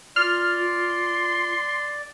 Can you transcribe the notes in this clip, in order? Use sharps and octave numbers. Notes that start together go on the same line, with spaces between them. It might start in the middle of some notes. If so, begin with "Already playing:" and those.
F4 D5 C6 F6